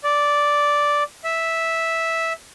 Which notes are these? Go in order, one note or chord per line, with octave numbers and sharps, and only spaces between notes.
D5
E5